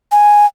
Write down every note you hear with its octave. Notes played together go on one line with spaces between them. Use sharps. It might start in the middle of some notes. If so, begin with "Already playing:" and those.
G#5